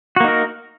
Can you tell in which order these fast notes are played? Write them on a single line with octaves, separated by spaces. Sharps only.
F#4 A#3 D#4 A#4